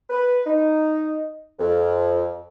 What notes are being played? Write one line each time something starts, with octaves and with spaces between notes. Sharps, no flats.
B4
D#4
F2